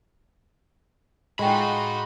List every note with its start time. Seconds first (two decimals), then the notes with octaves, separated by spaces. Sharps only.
1.39 A2 G#3 D#4 F4 F#4 G5 B5